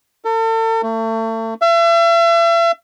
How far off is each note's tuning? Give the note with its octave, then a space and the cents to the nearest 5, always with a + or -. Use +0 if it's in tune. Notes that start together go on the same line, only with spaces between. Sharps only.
A4 +40
A3 +35
E5 +40